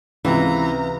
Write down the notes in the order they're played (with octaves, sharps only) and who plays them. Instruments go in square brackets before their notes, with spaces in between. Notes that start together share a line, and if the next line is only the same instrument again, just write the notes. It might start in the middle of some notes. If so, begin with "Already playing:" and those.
[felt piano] C#2 C3 [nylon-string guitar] E3 [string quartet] A#5